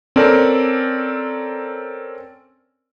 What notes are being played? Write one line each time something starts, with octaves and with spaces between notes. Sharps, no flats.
C4 C#4 A4 A#4 D5